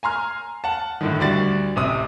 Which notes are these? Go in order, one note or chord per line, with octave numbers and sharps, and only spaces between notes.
G#5 A#5 C6 F6
F#5 A5
A2 D3 D#3
D2 G3 F#4 A6
A1 C3 D#6